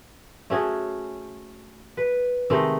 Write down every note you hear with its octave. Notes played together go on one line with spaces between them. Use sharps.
A3 C#4 F#4 G#4
B4
C3 D#3 G#3 A3